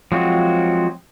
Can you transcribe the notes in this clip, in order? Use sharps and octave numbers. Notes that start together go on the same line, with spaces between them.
F3 F#3 G#3 C4 F#4